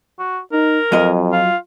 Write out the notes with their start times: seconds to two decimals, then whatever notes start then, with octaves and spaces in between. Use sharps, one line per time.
0.19 F#4
0.52 D#4 A#4
0.92 F2 F#3 D#5
1.32 F4